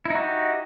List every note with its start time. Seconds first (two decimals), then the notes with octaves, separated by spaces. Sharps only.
0.05 E4
0.10 D#4
0.15 F#4
0.20 G4